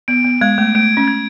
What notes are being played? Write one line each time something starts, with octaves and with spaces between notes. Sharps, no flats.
B3 D7
B3
G#3 G#6
A3
A3 D7
C#4
G#6